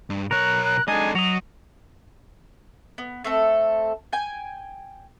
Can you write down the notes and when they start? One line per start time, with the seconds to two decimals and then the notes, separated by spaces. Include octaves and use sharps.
0.10 G2
0.31 B1 A#4 C#5 F#6
0.65 F#6
0.88 G#3 D4 D#4 A4 D#5 G#5
1.15 F#3 F#4 D#5 F7
2.98 B3
3.24 A3 C4 A4
4.13 G5 G#5